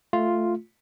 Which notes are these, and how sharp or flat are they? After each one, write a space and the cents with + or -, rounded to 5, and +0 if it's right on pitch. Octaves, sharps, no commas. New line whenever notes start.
A3 +0 F4 +0